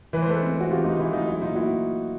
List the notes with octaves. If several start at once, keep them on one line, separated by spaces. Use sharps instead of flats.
E3 B4
C5
G#3 A4 B4
C4
C4 F#4
E3 F4 G4
G#3 D#4 F4
E3 E4
E3 D#4 F4
F#3 E4
A#2 D#4 F4
A#3 E4 F#4